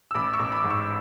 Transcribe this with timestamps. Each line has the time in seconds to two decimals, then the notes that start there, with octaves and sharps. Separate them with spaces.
0.11 E6
0.15 A1 B5 D6
0.33 C#6 E6
0.39 A1
0.52 B5 D6
0.64 G#2
0.70 C#6 E6